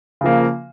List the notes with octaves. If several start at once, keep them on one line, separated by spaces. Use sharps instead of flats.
C#3 F3 A#3